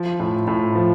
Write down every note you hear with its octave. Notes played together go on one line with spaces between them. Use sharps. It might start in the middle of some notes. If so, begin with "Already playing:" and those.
Already playing: F3
A2
A2
F3